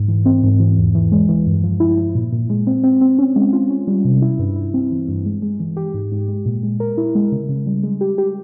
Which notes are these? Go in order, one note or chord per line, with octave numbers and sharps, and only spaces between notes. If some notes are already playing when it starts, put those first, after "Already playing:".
Already playing: G#2
E3
C4
G#2
E3
E2
E3
G#3
E3
G2
F3
E4
F3
A#2
A#2
G#3
C4
C4
C4
C#4
G#3
F4
C#4
G3
C3
E4
G2
E4
C4
E3
G2
G#3
G#3
E3
G4
G#2
G#2
G#3
A#2
G#3
A#4
E4
G#3
C#3
C#3
G3
G#3
G4
G4